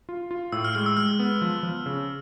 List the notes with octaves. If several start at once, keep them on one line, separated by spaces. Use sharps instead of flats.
F4
F4
A2 E6
F6
G#3 F6
E6
G#3 F6
B3
F3
F3
C#3